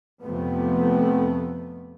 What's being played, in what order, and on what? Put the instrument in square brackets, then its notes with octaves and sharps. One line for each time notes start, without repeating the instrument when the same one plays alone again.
[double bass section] F2 C3 F3 A3 B3